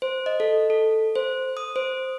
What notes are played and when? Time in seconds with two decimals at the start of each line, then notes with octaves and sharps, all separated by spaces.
0.02 C5
0.26 D#5
0.40 A4
0.70 A4
1.15 C5
1.57 D#6
1.76 C5